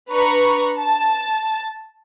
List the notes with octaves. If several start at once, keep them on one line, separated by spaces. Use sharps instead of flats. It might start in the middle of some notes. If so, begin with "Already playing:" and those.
D4 B4 A#5 C#6
A5